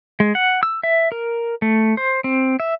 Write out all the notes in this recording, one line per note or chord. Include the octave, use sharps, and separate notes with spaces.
G#3
F#5
E6
E5
A#4
A3
C5
C4
E5